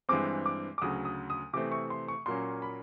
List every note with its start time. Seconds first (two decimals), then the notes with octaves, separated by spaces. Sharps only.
0.09 G2 E3 G#3 C4 D6
0.46 D6
0.78 D6
0.82 D2 C#3 F#3 D#6
1.05 D#6
1.30 D#6
1.53 C3 E3 A3 C4 D6
1.72 C#6
1.90 C6
2.08 C#6
2.26 A#2 F#3 A#3 C#4 C6
2.62 B5